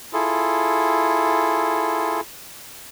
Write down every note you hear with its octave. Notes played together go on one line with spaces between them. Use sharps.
E4 F4 G#4 A4